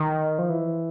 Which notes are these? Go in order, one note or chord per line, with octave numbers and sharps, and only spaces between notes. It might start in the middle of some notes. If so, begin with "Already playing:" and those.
Already playing: D#3
F3
E3